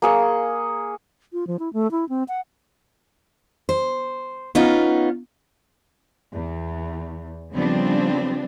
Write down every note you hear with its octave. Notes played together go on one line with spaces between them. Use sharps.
A#3 G#4 C#6
F4
F3
E4
A3
E4
C4
F#5
C5
B3 C#4 D#4 F4
E2
C#3 F3 G3 B3 C4 D4